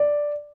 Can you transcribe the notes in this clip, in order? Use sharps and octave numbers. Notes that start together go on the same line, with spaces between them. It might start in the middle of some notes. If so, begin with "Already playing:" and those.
Already playing: D5